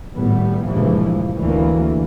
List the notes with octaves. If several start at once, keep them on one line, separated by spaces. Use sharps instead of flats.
G#1 A2 G3 B3
C#2 G2 A#2 E3 F3
D2 E3 A#3